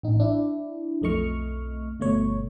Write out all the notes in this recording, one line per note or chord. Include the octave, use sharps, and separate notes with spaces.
A1 D#4
D4 E4
B1 F2 A3 D#5 C#6 F6
G1 B2 A3 C#5